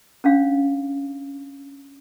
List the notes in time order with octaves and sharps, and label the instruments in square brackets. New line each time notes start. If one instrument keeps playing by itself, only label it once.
[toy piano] C#4 D4 F5